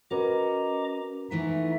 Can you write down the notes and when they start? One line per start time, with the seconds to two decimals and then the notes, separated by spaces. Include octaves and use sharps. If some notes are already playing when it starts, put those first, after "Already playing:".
0.11 C#4 F#4 A#4 B4 D#5 A#5 D6
1.31 E3 A3 B3 D#4 E5